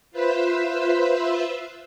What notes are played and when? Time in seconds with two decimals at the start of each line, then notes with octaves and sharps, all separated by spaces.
0.11 F4 B4 C5 E5 E6